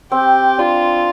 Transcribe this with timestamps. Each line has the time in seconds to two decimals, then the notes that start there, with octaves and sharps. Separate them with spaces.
0.12 C4 G4
0.58 D4 F4